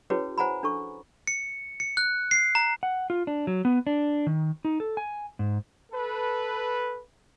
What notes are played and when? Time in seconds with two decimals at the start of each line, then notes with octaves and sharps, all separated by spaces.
0.10 C#4 E4 F#4 G#4 B4 C#5
0.38 C5 F#5 G#5 A#5 B5
0.63 D4 A4 C#6
1.27 C#7
1.80 C#7
1.97 F#6
2.31 C7
2.55 A#5
2.83 F#5
3.10 F4
3.27 D4
3.47 F#3
3.65 B3
3.87 D4
4.27 D#3
4.65 D#4
4.80 A4
4.97 G#5
5.39 G#2
5.92 A4 B4